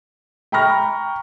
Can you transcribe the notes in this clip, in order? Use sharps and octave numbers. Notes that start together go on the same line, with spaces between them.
G5 A#5 B5 C#6 F6 A#6